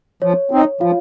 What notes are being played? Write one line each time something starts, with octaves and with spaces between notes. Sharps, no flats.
F3 C#5
C4 D#4
F3 F4 F5